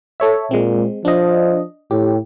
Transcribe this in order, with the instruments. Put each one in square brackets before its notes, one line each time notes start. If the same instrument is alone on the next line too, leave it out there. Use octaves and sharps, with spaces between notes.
[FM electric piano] A4 C#5 E5
[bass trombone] A#2 [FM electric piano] G#3 C4
[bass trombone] F3 [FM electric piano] D4 D#5
[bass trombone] A2 [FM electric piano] G4